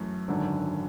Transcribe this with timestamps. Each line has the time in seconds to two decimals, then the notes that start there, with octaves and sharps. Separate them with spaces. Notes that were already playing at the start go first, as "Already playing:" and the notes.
Already playing: F#2 E3 A3
0.28 G#1 F#2 D3